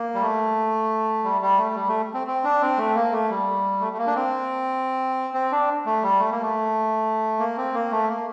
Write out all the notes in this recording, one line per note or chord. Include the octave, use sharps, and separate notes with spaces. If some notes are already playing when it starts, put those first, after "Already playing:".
Already playing: A#3
G3
A3
G3
G3
A3
G3
A3
C4
C4
D4
C4
A3
A#3
A3
G3
A3
A3
A#3
D4
C4
C4
D4
A3
G3
A3
A#3
A3
A#3
C4
A#3
A3
A#3